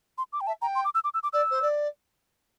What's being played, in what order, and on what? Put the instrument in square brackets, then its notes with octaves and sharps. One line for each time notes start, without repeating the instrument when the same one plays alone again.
[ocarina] C6
D6
G5
[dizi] E5 [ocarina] A5
[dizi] G5 [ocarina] A#5
[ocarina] C6
D6
E6
D6
E6
D6
[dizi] D5 [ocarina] E6
[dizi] C5
D5